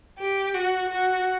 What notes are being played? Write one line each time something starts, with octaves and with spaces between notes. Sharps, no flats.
G4
F#4
F#4